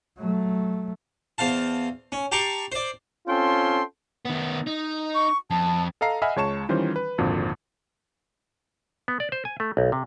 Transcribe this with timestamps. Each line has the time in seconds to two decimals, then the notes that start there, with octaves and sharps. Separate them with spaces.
0.18 F#3 A3
1.38 E2 C5 F5 A5
2.12 C#4
2.32 G4 G5 A5 A#5 C6 C#6
2.72 C5 D5
3.28 C4 C#4 F4 A4 G5 C6
4.25 D#3 B3
4.67 D#4
5.15 C#6
5.50 F2 A5
6.01 A4 D#5 F5 A#5 C7
6.22 D#5 E5 F#5 G#5 B5 F6
6.36 C#2 G#3 C#5 A5 C#6 E7
6.69 D#3 E3 G3 C#4 F4 C5
6.96 B4
7.18 G#1 F2 A#2 D3 F#4
9.08 B3
9.20 D5
9.32 C5
9.45 G#5
9.60 A3
9.77 B1
9.92 C3